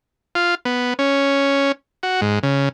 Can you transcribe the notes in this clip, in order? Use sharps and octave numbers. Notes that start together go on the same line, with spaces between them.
F4
B3
C#4
F#4
G#2
C#3